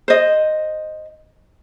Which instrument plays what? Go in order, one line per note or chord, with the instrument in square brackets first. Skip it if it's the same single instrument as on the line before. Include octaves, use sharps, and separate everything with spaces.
[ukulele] C5 D#5